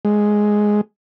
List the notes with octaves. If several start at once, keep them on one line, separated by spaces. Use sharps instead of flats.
G#3